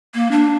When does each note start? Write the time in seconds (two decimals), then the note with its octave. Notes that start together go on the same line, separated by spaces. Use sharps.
0.15 A#3
0.31 D4